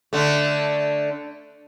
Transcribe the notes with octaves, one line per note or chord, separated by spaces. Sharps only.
D3 A3